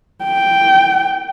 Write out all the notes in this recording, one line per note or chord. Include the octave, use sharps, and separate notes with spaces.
G5